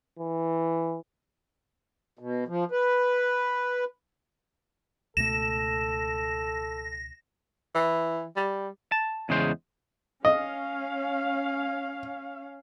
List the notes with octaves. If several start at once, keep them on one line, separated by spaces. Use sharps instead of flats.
E3
B2
F3
B4
C#2 B2 A3 A4 A#6 E7
E3
G3
A5
E2 C#3 G#3 C5
C#4 D#5 F5